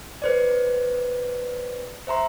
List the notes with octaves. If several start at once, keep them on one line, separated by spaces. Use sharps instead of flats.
B4 C5 D5
C5 E5 A#5 C6